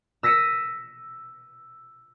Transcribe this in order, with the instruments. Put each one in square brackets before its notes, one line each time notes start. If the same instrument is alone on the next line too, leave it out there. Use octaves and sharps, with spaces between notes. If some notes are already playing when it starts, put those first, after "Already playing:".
[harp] E6 A#6 B6 C#7 D#7 E7